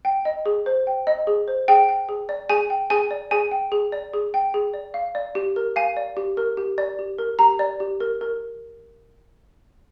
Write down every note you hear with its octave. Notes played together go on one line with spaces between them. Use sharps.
G5
D#5
G#4
C5
G5
D#5
G#4
C5
G#4 G5
G5
G#4
D5
G#4 G#5
G5
G#4 G#5
D5
G#4 G#5
G5
G#4
D5
G#4
G5
G#4
D5
F5
D5
G4
A#4
F5 G#5
D5
G4
A#4
G4
D5
G4
A#4
G4 A#5
D5
G4
A#4
A#4